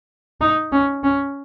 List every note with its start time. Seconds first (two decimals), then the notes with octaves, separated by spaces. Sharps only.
0.41 D#4
0.72 C#4
1.04 C#4